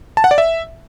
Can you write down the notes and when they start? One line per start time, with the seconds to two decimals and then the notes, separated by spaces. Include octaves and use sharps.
0.17 A5
0.24 F#5
0.31 D5
0.38 E5